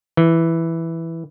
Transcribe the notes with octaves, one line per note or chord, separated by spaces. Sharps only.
E3